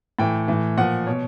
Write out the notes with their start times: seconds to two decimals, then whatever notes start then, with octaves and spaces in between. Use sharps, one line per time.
0.19 A2 E3 G5
0.48 A2 E3
0.78 A#2 F3 F#5
1.07 B2 C#5